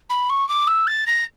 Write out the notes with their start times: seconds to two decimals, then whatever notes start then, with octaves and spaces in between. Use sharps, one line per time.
0.09 B5
0.29 C#6
0.48 D6
0.67 E6
0.87 A6
1.06 A#6